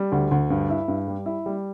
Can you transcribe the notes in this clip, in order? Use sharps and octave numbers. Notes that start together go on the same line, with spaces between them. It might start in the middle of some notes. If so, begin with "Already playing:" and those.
Already playing: G3
D2
D2
G2
E4
G2
G3
E4
G3